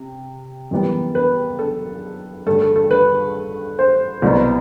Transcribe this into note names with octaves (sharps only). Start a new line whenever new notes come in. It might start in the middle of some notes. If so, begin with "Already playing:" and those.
Already playing: C3
F#2 E3 G3 B3
B4
A4
G2 D3 A3 A4
A4
A4
B4
C5
C2 B2 F#3 B3